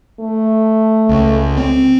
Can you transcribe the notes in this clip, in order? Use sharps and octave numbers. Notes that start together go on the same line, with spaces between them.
A3
C#2
C4